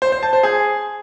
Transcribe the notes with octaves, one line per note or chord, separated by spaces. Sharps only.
C5
C5
A5
C5
G#4